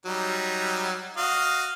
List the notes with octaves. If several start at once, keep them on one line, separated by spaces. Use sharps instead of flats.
F#3 G3 D#4
F#4 D#5 F5